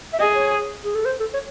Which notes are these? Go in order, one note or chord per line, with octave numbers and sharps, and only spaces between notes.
E5
G#4 D#5
C#5
G#4
A4
C5
A4
C#5